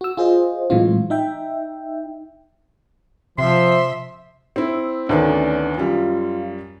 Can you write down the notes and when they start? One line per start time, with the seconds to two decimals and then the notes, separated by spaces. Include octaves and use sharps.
0.01 F#4 E6
0.17 F4 G#4 C5 D#5
0.70 A2 E3 F#3 G#3 C4 F4
1.10 D#4 E5 G5
3.38 C3 F3 E5 C6
4.56 C4 E4
5.09 D2 D#3 A3 B3 C#4 D4
5.78 F#2 G3 F4